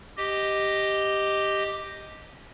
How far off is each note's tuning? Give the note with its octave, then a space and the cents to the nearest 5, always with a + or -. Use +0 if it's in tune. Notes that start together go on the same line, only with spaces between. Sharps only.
G4 +0 D#5 +0